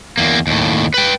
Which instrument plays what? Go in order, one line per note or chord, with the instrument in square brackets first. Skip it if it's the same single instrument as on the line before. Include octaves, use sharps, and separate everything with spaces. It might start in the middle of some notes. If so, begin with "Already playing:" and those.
[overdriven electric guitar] E2 A#3
D#2 A2
B4 G5